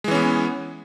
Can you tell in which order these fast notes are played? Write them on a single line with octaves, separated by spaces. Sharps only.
G#3 E3 C#4 B3